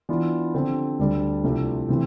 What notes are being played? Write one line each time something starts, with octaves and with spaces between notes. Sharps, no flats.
E3 B3 D4 F4
D3 F3 C4 G4 C5
D2 D3 G3 D4
C2 C3 F3 A3 D4
C3 E3 A3 C4